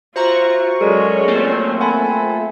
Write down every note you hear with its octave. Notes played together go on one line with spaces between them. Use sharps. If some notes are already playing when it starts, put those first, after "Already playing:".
F4 F#4 C5 E5 A#5 C#6
F#3 G#3 C#4 A4 A#4 D5
A3 A#3 C4 F4
A4 F#5 G#5 B5